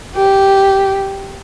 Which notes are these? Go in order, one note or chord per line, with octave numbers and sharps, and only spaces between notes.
G4